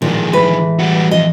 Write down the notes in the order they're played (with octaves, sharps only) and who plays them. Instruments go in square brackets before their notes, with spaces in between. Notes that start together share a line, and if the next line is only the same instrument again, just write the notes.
[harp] A1 G#3 [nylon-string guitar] A#2 [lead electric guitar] D#3 F3
[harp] E3 [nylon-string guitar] B4
[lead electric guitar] G3 F#4
[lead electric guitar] F2 [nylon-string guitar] D#5